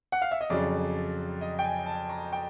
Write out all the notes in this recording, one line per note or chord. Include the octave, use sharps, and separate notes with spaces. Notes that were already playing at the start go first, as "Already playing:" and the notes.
F#5
F5
E5
D#5
F2 C#3 F#3 D5
D#5
G5
G#5
A5
A#5
G5